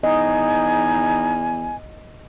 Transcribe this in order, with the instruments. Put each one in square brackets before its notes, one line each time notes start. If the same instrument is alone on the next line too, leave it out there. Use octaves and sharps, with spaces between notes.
[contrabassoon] E2 [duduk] D#4 [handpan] D#5 [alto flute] G#5